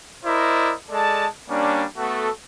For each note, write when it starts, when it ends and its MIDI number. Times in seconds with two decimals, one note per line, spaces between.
0.24 0.73 64
0.24 0.73 70
0.24 0.73 72
0.24 0.73 74
0.24 0.73 75
0.90 1.25 56
0.90 1.25 69
0.90 1.25 74
0.90 1.25 81
1.49 1.84 55
1.49 1.84 58
1.49 1.84 61
1.49 1.84 62
1.97 2.29 57
1.97 2.29 59
1.97 2.29 66
1.97 2.29 69